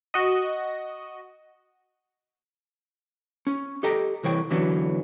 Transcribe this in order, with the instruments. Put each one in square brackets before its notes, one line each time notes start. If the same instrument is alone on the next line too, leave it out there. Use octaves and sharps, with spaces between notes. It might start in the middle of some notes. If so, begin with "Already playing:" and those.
[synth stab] F#4 D#5
[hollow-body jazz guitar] C#4
G4 A4 D#5 G5 A#5
C2 E3 C#5 G5
E2 D3 E3 F#3 C#4